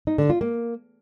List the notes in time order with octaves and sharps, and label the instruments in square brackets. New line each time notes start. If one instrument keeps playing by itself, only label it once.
[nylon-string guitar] D#4
D3
F4
A#3